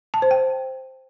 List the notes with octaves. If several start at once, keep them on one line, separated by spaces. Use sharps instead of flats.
A5
C5
G5